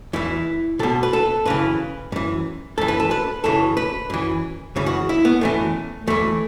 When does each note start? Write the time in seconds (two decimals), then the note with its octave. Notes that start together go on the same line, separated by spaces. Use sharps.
0.13 E2 E3 E4
0.79 B1 B2 A4
1.03 B4
1.13 A4
1.45 F#2 C#3 E3 B4
2.12 F#2 E3
2.78 F#2 E3 A4
2.88 B4
3.00 A4
3.11 B4
3.44 F#2 C#3 E3 A4
3.77 B4
4.10 F#2 E3
4.76 F#2 C#3 E3
4.86 F#4
5.09 E4
5.25 B3
5.41 F#2 C#3 E3 A3
6.07 E2 E3 A3